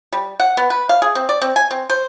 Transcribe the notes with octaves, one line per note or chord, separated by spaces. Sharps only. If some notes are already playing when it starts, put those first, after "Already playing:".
G3
F#5
B3
B4
F5
G#4
C4
D5
C4
G#5
C4
C5